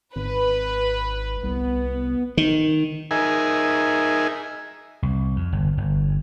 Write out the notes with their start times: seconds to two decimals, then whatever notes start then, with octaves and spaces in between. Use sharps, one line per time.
0.16 G#1 B4
1.43 C2 B3
2.37 D#3
3.11 D#4 G#4 A#4 E5 G#5
5.02 C2
5.36 F2
5.52 G1
5.78 G1